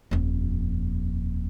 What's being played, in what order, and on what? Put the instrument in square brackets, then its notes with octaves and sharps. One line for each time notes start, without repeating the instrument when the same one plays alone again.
[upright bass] D#1 F2